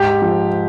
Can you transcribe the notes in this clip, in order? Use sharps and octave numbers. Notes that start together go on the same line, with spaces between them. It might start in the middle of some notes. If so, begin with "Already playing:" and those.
Already playing: G#2 G4
F3